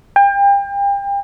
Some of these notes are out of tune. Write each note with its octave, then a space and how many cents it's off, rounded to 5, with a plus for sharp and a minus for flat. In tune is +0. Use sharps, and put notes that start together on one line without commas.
G5 +35